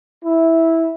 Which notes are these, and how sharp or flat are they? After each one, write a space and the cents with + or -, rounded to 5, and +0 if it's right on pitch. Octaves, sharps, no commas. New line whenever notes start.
E4 -10